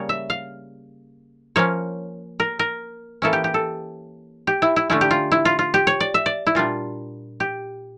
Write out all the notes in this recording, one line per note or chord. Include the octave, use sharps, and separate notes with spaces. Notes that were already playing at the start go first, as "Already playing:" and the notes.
Already playing: C#3 G3 A#3 C#5
E5
F5
F3 A#3 C#4 C#5
A#4
A#4
E3 A#3 C#4 E4 A4
G4
G4
A4
G4
E4
E4
D3 A3 C#4 E4
G4
F4
E4
F4
F4
G4
C#5
D5
E5
D5
E4
A#2 G3 D4 F4
G4